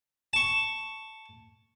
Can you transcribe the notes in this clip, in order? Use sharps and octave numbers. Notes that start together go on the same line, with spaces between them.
A5 C#6